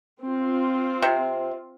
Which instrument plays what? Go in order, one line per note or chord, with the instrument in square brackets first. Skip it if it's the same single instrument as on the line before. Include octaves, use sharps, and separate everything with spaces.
[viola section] C4 F4
[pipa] C3